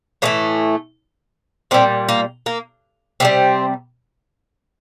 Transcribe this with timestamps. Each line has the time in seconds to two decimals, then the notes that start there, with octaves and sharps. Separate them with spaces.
0.22 A2 E3 A3 A#3
1.71 A#2 G3 C4
2.09 A#3
2.46 A#3
3.20 C3 E3 G3 C4